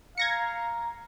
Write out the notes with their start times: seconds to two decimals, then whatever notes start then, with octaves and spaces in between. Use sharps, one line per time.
0.18 F5 A#5 G#6 A#6 C#7